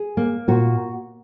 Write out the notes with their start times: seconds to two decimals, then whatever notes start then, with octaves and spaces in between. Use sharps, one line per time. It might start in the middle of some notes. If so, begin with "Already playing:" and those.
Already playing: G#4
0.17 A#3
0.48 A#2 F#4